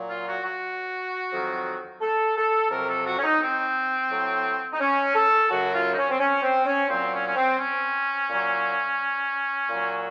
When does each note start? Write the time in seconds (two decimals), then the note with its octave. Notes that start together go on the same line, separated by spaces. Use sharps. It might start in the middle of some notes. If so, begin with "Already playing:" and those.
Already playing: A#2 F#3
0.09 F4
0.26 F#4
0.44 F#4
1.32 F2 D#3 F#3
2.01 A4
2.36 A4
2.70 F2 C3 F#3 A#4
2.89 A4
3.05 F#4
3.18 C#4
3.24 D#4
3.41 C4
4.11 A2 F#3
4.72 D#4
4.80 C#4
5.15 A4
5.50 F#2 C#3 F#3 F#4
5.74 F4
5.91 D#4
5.97 C#4
6.10 C4
6.19 C#4
6.43 C4
6.66 C#4
6.89 A#2 F#3 C4
7.13 C#4
7.27 C#4
7.36 C4
7.59 C#4
8.29 A#2 F#3
9.68 A#2 F#3